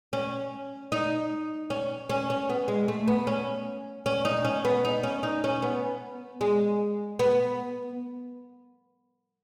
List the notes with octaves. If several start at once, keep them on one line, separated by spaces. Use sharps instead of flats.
C#4
D#4
C#4
C#4
C#4
B3
G#3
A3
B3
C#4
C#4
D#4
C#4
B3
D#4
C#4
D#4
C#4
B3
G#3
B3